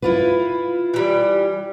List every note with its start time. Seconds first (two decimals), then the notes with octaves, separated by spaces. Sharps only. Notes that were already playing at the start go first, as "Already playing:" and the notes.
0.02 E4 F4 B4
0.94 E3 G3